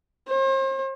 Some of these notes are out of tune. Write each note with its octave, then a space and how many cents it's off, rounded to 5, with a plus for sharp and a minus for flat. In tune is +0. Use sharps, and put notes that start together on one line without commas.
C5 +40